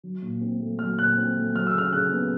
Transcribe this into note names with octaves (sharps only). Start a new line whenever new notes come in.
F#3
A#2
C4
A3
F#3 F6
A#2 F#6
C4
A3
F#3 F6
E6
C#3 F6
C#3 F#6
B3